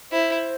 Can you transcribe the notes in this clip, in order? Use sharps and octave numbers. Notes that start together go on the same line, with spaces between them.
E4 C5